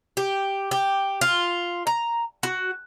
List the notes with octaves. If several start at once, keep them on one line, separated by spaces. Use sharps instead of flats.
G4
G4
F4
A#5
F#4